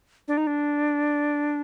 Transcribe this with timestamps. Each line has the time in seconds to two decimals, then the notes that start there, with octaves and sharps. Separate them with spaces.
0.28 D4
0.37 D#4
0.47 D4